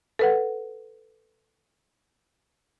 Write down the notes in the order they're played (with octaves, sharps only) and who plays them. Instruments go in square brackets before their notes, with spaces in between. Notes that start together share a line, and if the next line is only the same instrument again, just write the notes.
[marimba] A4 B4 F#5